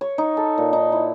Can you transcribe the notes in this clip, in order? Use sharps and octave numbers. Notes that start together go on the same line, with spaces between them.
C#5
D#4
A4
A#2
D#4
E4